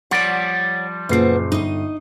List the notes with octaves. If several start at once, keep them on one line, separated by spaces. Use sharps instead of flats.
F3 G3 C#5 D5 F#5
F#1 A#2 B3 C4 C7
G1 D#4 D#5